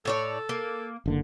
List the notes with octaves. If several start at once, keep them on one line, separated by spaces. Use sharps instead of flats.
A2 A4 C#5 D5
A#3
F#1 D3 A#3